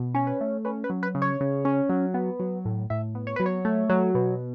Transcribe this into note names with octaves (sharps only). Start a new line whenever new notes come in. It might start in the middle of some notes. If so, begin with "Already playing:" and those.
Already playing: B2
C#4 C#5
B4
A3
C#4 B4
B4
F#3
B4
C#3
C#5
C#3
C#4
F#3
B3
F#3
A2
A2 E5
B3
C#5
F#3 B4
C#5
A3
F#3
B2